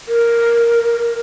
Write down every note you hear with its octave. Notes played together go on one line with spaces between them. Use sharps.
A#4